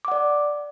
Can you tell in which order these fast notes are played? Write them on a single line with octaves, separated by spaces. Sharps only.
D6 F#5 D5